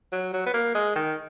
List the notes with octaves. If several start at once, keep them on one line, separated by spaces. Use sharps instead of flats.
F#3
F#3
B3
A#3
G#3
D#3